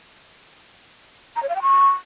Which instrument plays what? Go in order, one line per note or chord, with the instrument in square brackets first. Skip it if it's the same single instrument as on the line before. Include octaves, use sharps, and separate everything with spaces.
[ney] A#5
C#5
F5
G5
C#6